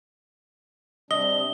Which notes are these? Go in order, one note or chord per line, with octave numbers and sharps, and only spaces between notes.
C3 G3 D4 D#5 G7